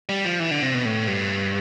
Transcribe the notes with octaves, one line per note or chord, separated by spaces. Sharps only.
G3
F3
E3
D3
C3
B2
A2
G2